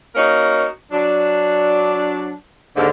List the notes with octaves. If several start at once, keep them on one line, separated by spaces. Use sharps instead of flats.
A#3 C#4 D#4 F#4 A#4
F#3 D4
D#2 G#2 D3